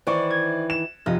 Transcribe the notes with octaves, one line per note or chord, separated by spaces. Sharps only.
D#3 E3 E4 C5 D5 C#6
G#6
E7
F1 F4 D#5